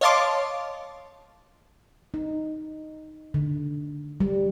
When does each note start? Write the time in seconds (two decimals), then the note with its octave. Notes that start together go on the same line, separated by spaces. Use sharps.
0.01 C#5 D#5 F5 A5 C6 D6
2.14 D#4
3.34 D3
4.20 G3